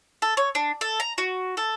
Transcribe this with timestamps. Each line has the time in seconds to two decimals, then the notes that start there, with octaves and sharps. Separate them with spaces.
0.22 A4
0.37 C#5
0.55 D4
0.81 A4
1.00 A#5
1.18 F#4
1.57 A4